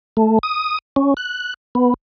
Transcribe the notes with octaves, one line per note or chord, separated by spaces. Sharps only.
A3
D#6
C#4
F#6
B3